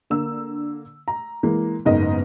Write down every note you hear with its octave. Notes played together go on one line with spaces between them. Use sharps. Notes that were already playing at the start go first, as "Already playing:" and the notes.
D3 A#3 E6
A#5
E3 G#3 A#3
F#1 G#2 B3 A#4 D#5